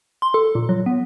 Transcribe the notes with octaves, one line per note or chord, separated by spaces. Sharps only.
C6
A4
A#2
F#3
B3